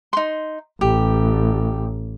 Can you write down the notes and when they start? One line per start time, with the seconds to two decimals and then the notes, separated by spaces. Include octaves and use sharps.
0.13 D#4 C6
0.81 A1 G4